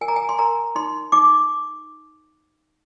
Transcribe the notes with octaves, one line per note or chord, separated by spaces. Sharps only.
A#4 G#5
A#5
G#5
C6
A#4 A#5
D#4 C6
D#4 D6